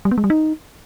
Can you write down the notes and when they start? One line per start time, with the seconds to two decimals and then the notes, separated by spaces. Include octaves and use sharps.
0.05 G3
0.11 B3
0.18 G#3
0.24 G3
0.30 D#4